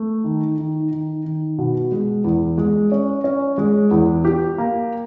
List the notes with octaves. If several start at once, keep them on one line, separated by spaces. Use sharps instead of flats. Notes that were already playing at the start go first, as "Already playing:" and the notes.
Already playing: A3
D#3
D#3
D#3
D#3
B2
G#3
E2
G#3
C#4
C#4
G#3
E2
G4
A#3